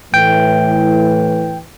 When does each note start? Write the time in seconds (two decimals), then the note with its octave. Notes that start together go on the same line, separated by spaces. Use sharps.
0.14 A2 E3 G5